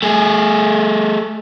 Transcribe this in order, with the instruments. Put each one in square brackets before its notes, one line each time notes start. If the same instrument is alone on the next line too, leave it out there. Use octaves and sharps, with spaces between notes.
[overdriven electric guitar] A3 G#4